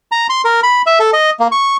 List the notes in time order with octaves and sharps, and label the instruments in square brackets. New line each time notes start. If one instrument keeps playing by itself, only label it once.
[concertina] A#5
C6
A#4
B5
E5
A4
D#5
A#3
C#6